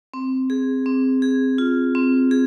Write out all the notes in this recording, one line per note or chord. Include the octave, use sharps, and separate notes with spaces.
C4
G#4
C4
G#4
F4
C4
G#4